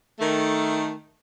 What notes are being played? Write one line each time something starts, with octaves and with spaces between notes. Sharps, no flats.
D#3 A3